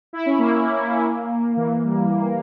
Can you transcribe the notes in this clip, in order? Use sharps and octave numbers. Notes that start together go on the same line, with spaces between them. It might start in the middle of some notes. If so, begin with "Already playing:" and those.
E4
C#4
A#3
E3
G3